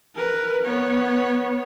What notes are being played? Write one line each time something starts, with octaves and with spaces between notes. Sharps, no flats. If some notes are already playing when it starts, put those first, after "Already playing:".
A#4 B4
B3 C#5